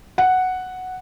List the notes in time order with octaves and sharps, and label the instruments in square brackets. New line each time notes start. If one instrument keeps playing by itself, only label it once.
[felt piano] F#5